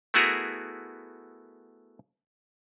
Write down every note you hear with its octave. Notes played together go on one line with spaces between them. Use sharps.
A3 B3 E4 F#4 G#4 A#4